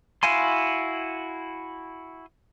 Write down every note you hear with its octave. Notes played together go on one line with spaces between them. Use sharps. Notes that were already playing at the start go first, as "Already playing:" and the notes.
E4 F#4 F5 G#5 C6